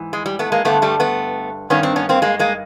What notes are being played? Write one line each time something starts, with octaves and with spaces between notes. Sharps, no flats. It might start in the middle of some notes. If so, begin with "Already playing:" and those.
Already playing: G#2 E3
G#3
G3
A3 B3
G#3 A#3
G2 D3 A3 B3
G3 A3
A3 B3
G2 D#3 B3 C#4
C4 D4
B3 C#4
A#3 C4
G#3 A#3
G#3 A#3